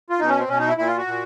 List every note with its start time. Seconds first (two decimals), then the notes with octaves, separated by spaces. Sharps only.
0.10 F4
0.19 B2 D#4
0.29 C#4
0.39 C4
0.48 B2 C#4
0.59 D#4
0.67 E4
0.78 A#2 E4
0.87 F4
0.97 F#4
1.07 A#2